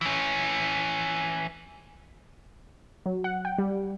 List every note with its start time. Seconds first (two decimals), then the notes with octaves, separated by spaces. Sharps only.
0.01 E3 C#4
3.06 F#3
3.24 F#5
3.45 G5
3.58 G3